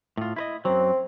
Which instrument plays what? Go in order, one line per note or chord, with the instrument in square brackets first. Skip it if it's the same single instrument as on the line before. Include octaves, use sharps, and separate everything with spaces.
[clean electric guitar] A2 F4
E4 B4 D#5
[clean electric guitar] F#2 F#3 [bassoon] C4